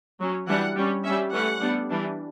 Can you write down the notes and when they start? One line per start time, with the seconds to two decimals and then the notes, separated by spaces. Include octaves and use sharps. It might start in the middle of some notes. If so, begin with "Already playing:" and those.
0.19 F#3 C#4
0.48 E3 G3 D4 F#5
0.76 G3 C#4
1.05 G3 C#4 E5
1.33 E3 A3 C#4 F#5
1.61 G3 B3 D4
1.90 E3 G3 D4